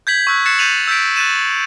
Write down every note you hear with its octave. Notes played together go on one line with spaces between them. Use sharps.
G6 G#6 B6 F#7
C#6 E6 F#6
F#6 A6 C7 C#7 E7
G6 A6 B6 D#7 F7 F#7
E6 G6 A6 B6 D7
F#6 A6 D#7 E7